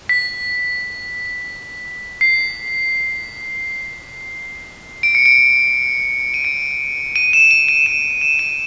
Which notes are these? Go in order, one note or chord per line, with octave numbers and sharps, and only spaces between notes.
B6
C7
D7
C#7
D7
D#7
D7
D#7
E7
D#7
D#7
E7
E7
D#7